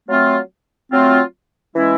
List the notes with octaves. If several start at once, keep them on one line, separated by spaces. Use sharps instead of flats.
F#3 A3 C4 F4
F#3 A3 C4 F4
E3 G#3 C#4 E4